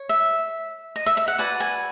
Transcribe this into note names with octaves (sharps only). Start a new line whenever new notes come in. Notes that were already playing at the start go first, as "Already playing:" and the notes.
Already playing: C#5
E5
D#5
E5
E5
F#5
F#4 B4 D5 G#5
G#5